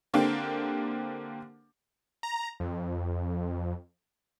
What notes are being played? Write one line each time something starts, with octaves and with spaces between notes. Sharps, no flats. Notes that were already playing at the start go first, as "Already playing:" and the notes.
D3 A#3 C4 D4 G4
A#5
F2